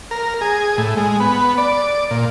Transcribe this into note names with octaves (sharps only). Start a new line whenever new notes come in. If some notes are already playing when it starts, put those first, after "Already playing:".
A#4
G#4
A2
G#3
B3
D5
A#2